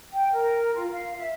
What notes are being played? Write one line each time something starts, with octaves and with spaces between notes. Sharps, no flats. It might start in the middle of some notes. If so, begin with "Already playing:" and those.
G5
A#4
F4
F5
E5